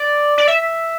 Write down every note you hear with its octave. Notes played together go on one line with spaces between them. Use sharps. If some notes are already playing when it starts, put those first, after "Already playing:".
Already playing: D5
D5
E5